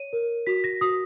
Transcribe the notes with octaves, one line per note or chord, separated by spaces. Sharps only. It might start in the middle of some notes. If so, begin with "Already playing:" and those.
Already playing: C#5 D#7
A#4
F#4 B6
A#6
F#4 D#6